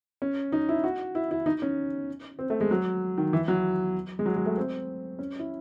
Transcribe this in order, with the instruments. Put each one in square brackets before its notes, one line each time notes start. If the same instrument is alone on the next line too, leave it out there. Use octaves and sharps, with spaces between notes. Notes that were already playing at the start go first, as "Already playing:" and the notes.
[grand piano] C#4
D#4
E4
F#4
E4
E4
D#4
C#4
C4
A3
G#3
F#3
D#3
E3
F#3
G#3
F#3
G#3
A3
C4
C#4
E4